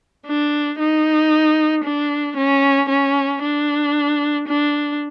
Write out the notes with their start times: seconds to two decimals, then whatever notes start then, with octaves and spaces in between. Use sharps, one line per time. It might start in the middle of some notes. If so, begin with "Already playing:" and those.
0.26 D4
0.79 D#4
1.84 D4
2.37 C#4
2.90 C#4
3.42 D4
4.48 D4